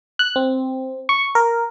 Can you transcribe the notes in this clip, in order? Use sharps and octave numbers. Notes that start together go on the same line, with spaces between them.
F#6
C4
C#6
A#4